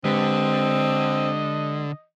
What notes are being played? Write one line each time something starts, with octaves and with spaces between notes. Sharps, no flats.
D3 G#3 C4 G4 B4 D#5